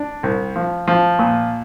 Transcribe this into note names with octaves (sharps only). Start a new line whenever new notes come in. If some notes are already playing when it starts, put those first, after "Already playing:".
Already playing: D4
C2
F3
F3
A#2